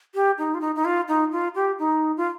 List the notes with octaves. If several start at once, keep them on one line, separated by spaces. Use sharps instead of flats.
G4
D#4
F4
D#4
D#4
F4
D#4
F4
G4
D#4
F4